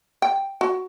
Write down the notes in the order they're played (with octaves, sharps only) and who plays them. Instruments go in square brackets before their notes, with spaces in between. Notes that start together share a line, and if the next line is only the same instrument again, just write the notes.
[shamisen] G5
F#4